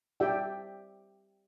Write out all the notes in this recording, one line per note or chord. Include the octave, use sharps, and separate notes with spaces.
G4 D5 E5 G5